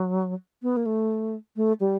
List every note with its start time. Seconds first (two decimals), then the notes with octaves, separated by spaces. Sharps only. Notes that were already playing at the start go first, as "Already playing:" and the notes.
Already playing: F#3
0.62 B3
0.77 A#3
0.86 A3
1.56 A3
1.80 G3